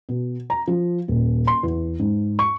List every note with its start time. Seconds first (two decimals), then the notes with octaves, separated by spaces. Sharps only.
0.09 B2
0.50 A#5
0.68 F3
1.08 D#1
1.47 C6
1.63 E2
1.99 G#2
2.39 C#6